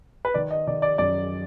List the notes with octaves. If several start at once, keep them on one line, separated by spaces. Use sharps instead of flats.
B4
D#3 D5
D#5
D#3 D5
D5
F#2 D5